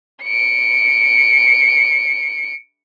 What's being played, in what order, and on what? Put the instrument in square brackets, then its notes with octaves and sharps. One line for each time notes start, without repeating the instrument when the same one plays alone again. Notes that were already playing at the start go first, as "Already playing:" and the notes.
[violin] C#7 D7